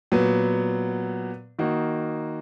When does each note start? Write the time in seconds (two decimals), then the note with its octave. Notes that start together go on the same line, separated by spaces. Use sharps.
0.12 A#2 F#3 B3
1.59 D#3 A#3 D#4 F#4